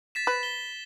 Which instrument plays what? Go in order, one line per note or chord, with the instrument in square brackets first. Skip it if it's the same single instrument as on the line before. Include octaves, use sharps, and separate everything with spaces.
[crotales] A6 B6 E7
[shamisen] B4
[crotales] G7